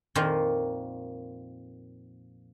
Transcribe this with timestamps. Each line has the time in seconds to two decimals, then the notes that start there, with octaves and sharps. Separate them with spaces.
0.15 F2 A#2 D#3 F3 A#3 F4